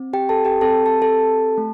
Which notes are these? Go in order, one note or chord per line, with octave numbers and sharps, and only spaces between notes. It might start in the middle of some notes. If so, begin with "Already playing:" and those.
Already playing: C4
G4 G5
A4 A5
G4 G5
C4 G4 A4 A5
A5
A4 A5
A3